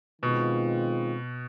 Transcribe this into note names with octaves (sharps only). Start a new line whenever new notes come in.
B2 D#3 G#3 C4 F4